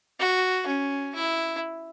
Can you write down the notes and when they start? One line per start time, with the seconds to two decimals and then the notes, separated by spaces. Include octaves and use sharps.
0.20 F#4
0.67 C#4
1.15 E4